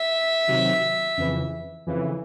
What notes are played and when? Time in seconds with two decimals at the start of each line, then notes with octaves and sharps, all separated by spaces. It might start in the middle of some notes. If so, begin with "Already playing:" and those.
Already playing: E5
0.47 C3 D#3 F#3
1.17 F2 C#3 E3
1.87 F2 C#3 E3